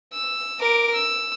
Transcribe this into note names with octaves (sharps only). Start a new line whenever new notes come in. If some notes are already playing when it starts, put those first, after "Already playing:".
E6
A#4 D6
E6